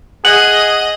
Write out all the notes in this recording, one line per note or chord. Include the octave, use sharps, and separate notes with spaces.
G#4 D#5 F#5 F#7